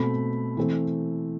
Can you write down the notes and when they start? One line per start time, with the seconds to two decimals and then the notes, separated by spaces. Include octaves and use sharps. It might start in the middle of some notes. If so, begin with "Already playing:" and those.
Already playing: B2 A3 C4 B5
0.57 E3 A3 C4